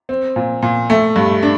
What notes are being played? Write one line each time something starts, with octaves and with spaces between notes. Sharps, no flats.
C4
A#2
A#2
A3
G2
D4